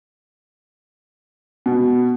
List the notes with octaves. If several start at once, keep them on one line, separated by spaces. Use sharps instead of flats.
B2